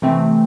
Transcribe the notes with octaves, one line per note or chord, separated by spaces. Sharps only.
C3 E3 A3 C4